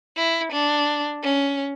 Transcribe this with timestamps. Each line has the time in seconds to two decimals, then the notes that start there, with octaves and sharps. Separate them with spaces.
0.16 E4
0.52 D4
1.23 C#4